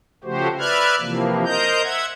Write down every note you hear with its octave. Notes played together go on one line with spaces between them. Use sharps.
C#3 F3 A3 F#4 G4 C5
B4 D5 E5 F6 F#6 G#6
C3 E3 F3 A#3
A#4 C5 D#5 A#5 G6
E5 F#5 G#6